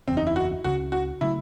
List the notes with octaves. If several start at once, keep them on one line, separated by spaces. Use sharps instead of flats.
F#1 E2 C#3 C4
D#4
E4
F#4
C#2 C#3 G#3 C#4 F#4
F#4
C#3 F#3 A3 E4